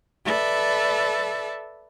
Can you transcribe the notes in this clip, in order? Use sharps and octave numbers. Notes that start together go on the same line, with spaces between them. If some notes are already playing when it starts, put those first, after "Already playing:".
A4 B4 D5 E5